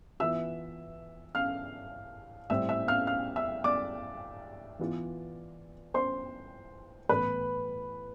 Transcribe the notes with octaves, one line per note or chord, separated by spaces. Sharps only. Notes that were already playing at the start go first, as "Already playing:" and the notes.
E3 B3 F4 E5 E6
F5 F6
A2 G3 C4 E4 E5 E6
E5 E6
F5 F6
F5 F6
E5 E6
D5 D6
E3 B3 F4
C5 C6
A2 E3 B3 B4 B5